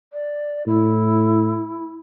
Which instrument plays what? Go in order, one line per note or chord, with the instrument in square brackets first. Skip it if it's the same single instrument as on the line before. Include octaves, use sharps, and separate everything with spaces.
[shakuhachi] D5
[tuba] A2 [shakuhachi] E4